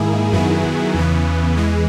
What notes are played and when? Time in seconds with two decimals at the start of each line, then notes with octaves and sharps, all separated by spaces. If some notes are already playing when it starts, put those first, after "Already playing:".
Already playing: G#2 D#3 A#3 E4 G#4
0.32 F#2 D#3 F#3 B3 E4 G#4
0.94 E2 C#3 E3 B3
1.57 E3 G#3